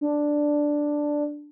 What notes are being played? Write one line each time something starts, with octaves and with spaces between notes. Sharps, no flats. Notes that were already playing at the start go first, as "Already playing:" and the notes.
D4